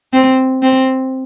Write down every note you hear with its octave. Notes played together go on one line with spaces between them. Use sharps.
C4
C4